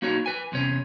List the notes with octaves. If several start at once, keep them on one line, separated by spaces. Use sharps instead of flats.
A#3 D#4 F#4 C#5
B4 G#5
E2 C3 C#4 C#5